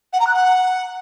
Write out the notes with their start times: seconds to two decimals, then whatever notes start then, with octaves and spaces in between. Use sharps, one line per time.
0.13 F#5
0.20 A#5
0.27 F#6
0.34 F#5